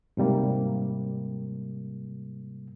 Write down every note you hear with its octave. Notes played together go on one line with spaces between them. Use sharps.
G#2 C3 G3 A#3